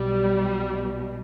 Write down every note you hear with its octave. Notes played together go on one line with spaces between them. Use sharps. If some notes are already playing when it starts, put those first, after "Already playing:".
Already playing: B1 B2 G3